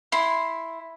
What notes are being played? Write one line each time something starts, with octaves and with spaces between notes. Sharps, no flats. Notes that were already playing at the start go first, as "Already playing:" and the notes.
E4 C6